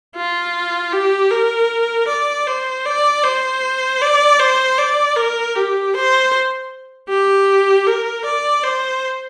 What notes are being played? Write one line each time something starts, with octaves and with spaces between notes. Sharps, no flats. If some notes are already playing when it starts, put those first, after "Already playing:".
F4
G4
A#4
D5
C5
D5
C5
D5
C5
D5
A#4
G4
C5
G4
A#4
D5
C5